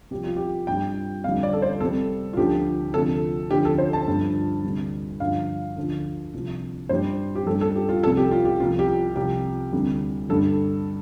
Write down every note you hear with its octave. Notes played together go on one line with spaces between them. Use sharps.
C2 C3 F3 G4
F4
G4
G2 G3 G5
F2 D3 G3 F5
D5
A4
C5
C2 C3 G3 A4
F4
D2 D3 F3 G4
D2 C3 F3 A4
D2 D3 F3 G4
A4
C5
A5
G2 D3 F3
D2 C3 G3
G2 D3 F3 F5
D2 D3 F3
C2 C3 F3
G2 G3 C5
G4
G2 G3 A4
A4
G4
F4
C2 C3 F3 A4
G4
F4
G4
C2 C3 F3 F4
G4
C2 C3 F3 G4
D2 C3 G3
G2 D3 G3 A4